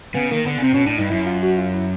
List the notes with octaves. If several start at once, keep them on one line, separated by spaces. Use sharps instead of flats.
C#3 B3
D#3 A#3
D3 B3
C#3
C3 C4
B2 C#4
A2 D4
G2 D#4
F#2 E4
F4
F#4
F4
E4